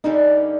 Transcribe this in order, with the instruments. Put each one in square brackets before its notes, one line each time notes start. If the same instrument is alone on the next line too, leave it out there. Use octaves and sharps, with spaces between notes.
[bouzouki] D3 G3 A#3 C#4 [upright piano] D#4